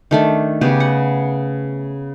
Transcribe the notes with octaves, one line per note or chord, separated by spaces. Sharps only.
D#3 A3 D4
C#3 B3 G4
F#5